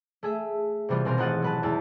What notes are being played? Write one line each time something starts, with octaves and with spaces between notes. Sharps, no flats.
A3 G#4 E5
C3 E3 G3 B3 F4
B2 G#3 C4 A#4
A1 D#3 F4 F#5 D#6 A6
F#3 B4 A5
E2 G#3 E4 A6